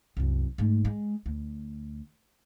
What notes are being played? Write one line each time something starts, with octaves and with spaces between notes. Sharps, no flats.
C2 F#2
G#2 A3
G#3
D2